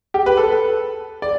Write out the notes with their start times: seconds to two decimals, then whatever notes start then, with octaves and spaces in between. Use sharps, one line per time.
0.14 G4
0.26 B4
0.37 A4
1.22 D5